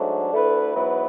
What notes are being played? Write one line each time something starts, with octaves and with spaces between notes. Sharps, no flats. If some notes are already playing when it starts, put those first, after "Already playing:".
Already playing: G#2 F#3 A3 D4
D2 D3 A3 E4 B4
G#2 F#3 B3 E4 B4